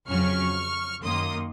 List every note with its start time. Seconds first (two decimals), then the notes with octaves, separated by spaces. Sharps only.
0.09 F2 C#3 F#3 C#4 C#6 F6
1.03 F#2 D#3 A#3 C6 D#6